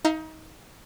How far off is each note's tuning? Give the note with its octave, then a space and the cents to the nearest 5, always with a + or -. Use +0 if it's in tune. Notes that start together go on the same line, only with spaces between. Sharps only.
D#4 +25 F5 -30 A#5 -15